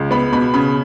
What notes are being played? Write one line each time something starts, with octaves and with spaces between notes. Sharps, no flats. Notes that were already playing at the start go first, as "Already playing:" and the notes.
Already playing: C#2
B3 B5
B2 B5
C#3 B5